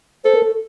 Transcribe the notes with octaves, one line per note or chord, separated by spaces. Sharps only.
A4 C5
A#4
A4